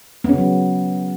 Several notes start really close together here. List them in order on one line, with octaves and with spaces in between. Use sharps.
B3 C#4 C#3 F#3